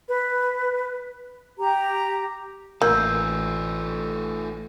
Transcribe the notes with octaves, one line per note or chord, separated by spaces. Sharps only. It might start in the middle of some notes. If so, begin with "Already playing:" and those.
B4
G4 A#5
A1 A3 A#3 F4 E6 G6